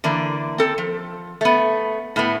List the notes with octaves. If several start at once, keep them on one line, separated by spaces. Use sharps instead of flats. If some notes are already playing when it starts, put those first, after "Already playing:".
D3 E3 A#3 D4
C4 A4
F3
A3 B3
A2 A3 B3